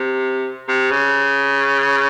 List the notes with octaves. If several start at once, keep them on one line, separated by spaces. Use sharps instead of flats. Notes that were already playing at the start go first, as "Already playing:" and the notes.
Already playing: C3
C3
C#3